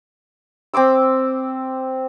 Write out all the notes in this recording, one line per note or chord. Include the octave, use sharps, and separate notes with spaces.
C4 C6 D6 E6